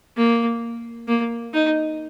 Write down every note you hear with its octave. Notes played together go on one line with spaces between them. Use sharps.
A#3
A#3
D#4